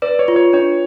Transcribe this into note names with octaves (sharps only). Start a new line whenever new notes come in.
B4 D5
C#5
F4
C#5
D4 C#5